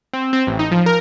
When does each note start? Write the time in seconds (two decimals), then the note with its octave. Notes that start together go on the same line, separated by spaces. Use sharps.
0.13 C4
0.33 C4
0.47 A1
0.59 D#4
0.71 F3
0.86 A#4